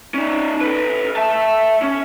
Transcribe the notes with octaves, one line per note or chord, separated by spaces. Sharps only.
C#4 D#4
A4 B4
E5 A5
C#4